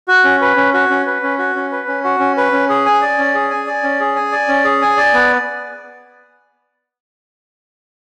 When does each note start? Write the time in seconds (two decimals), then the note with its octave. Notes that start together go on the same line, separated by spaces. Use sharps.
0.08 F#4
0.24 C#4
0.42 B4
0.57 C#4
0.74 F#4
0.90 C#4
1.07 B4
1.23 C#4
1.38 F#4
1.56 C#4
1.72 B4
1.88 C#4
2.04 F#4
2.20 C#4
2.37 B4
2.52 C#4
2.69 G#4
2.86 G#5
3.01 D5
3.18 C#4
3.35 G#4
3.51 G#5
3.67 D5
3.83 C#4
4.00 G#4
4.16 G#5
4.32 D5
4.48 C#4
4.64 G#4
4.82 G#5
4.97 D5
5.13 B3